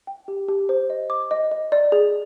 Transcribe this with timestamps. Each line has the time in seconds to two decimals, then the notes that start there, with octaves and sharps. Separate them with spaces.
0.07 G5
0.28 G4
0.48 G4
0.69 C5
0.90 D#5
1.10 D6
1.31 D#5
1.51 D#5
1.72 D5
1.92 G#4